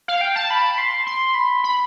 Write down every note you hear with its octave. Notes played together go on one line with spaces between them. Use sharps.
F5
G5
A5
B5
C6
C6
B5
B5